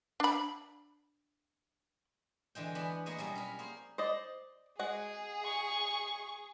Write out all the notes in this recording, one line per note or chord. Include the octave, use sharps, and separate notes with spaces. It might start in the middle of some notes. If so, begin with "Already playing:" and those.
D4 B5
D3 E3 G#3 G5
E3 B3 D4 B5
G#3 A#3 B4 C#5 D#5 G#5
B2 F#3 G3 E4
C#4 A#4 B5
A#3 G#4 C5
C5 D5 D#5
G#3 F#4 G#4 F#5
C#6